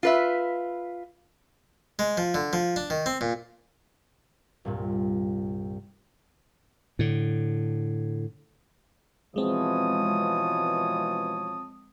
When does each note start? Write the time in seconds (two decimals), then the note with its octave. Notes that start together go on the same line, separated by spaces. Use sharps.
0.03 F4 B4 E5
1.99 G#3
2.17 F3
2.34 D3
2.53 F3
2.76 D4
2.90 D#3
3.06 C4
3.21 A#2
4.65 C2 G2 A#2
6.99 A2 D3
9.36 B2 E3 F3 G#3 C4 C#5 A5 D#6